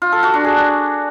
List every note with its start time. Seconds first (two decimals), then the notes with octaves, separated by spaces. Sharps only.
0.02 F4
0.12 A4
0.23 F#4
0.34 D4
0.44 G#4